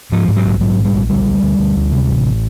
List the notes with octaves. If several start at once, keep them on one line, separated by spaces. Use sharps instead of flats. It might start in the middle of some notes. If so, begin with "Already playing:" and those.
G#2 F3
G#2
F#3
A#1
G#2 F#3
A#1
G3
A#1
D2 G3
D2
D2
D2
D2
C3
A1